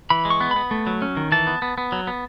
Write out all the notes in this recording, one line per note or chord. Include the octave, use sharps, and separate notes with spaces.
E3 B5
G#3
C#6
B3
B5
B3
A3
F#3
C#4
D#3
E3 A5
B3
B3
B3
F#3
B3